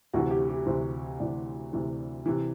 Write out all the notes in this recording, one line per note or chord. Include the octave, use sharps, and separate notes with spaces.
D2 C3 E3 F#4
G4
G4
D2 C3 E3 C5
D2 C3 E3 D5
D2 C3 E3
C3 E3